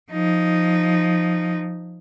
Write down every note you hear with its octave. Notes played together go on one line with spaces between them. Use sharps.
F3 D#4